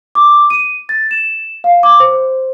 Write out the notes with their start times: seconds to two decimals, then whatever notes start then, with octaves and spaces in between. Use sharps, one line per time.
0.15 D6
0.50 D#7
0.89 A6
1.11 E7
1.64 F5
1.83 D6
2.00 C5